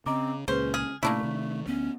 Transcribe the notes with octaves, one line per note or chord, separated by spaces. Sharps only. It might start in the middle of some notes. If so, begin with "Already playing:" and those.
C#3 C4 D#5 A#5 D6
C#2 A#2 C#4 G#4 B4 C5
G#4 F6
A#2 C#3 A3 A#3 D4 E4 C#6 B6
C3 D#3
D2 B3 C#4